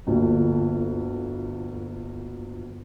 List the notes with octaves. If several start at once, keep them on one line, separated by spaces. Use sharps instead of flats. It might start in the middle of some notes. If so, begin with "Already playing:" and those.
G1 D2 A#2 F3